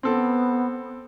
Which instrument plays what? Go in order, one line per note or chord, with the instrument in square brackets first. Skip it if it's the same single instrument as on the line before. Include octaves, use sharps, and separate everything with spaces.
[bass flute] B3 [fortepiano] C4 A4